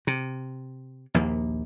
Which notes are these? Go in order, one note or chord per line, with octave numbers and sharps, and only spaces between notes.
C3
A#1 D#2 A#3